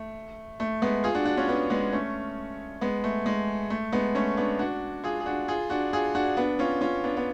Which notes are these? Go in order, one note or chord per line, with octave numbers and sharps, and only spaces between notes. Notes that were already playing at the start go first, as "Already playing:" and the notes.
Already playing: A3
A3
G#3 B3
F4 G#4
D4 F#4
D4 F#4
C#4 F4
B3 D4
G#3 B3
A3 C#4
G#3 B3
A3
G#3
A3
G#3 B3
A3 C#4
B3 D4
D4 F#4
F4 G#4
G#4
D4 F#4
F4 G#4
D4 F#4
F4 G#4
D4 F#4
B3 D4
C#4 F4
C#4 F4
B3 D4
B3